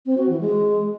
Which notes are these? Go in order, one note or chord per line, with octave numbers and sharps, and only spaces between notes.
C4
F#4
E3
G#3